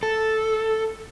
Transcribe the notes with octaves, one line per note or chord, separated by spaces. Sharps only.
A4